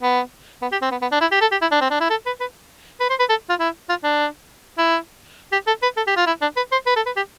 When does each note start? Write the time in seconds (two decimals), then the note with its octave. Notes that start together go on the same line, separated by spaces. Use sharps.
0.02 B3
0.62 B3
0.72 G4
0.82 C4
0.91 B3
1.02 B3
1.12 D4
1.21 E4
1.31 G4
1.41 A4
1.52 G4
1.61 E4
1.71 D4
1.81 C4
1.91 D4
2.00 E4
2.10 A4
2.26 B4
2.40 B4
3.00 B4
3.10 C5
3.19 B4
3.29 A4
3.49 F4
3.59 E4
3.89 F4
4.04 D4
4.78 E4
5.52 G4
5.67 A4
5.83 B4
5.97 A4
6.07 G4
6.17 F4
6.27 E4
6.41 D4
6.56 B4
6.72 C5
6.86 B4
6.96 A4
7.06 B4
7.16 G4